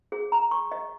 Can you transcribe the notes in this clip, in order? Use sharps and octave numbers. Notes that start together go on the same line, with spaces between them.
G#4
A#5
C#6
D#5